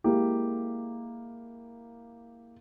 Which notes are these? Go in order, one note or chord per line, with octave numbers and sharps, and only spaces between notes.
G#3 A#3 E4 G4